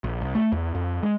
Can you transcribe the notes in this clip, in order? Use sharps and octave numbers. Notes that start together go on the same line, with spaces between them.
A#1
C2
A3
E2
F2
G#3